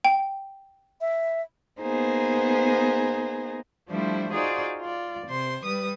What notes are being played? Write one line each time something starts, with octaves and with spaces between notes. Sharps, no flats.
G5
E5
A#3 B3 D#4 G#4 C5
F3 G3 A3 D4 E4 C5
D#4 F4 F#4 G#4 C5 D5
F4 D5
C3 C5 C6
G3 B4 D#6